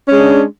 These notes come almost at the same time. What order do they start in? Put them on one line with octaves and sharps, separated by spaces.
C#4 G#3 D4